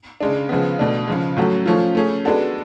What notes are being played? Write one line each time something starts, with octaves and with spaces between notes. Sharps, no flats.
C#3 G#3 D4
C#3 F3 G#3 B3
B2 A3 D4
C#3 F3 G#3
A2 F#3 C#4 F#4 A4
F3 A3 C#4 F4
A3 C#4 G#4
G#3 B3 D4 F#4 A4